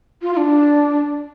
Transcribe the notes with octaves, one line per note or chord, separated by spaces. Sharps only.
F4
F4
D4